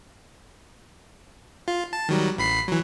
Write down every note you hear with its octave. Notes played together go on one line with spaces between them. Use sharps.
F4
A5
D#3 F#3 G3
A1 B5 C7
E3 F#3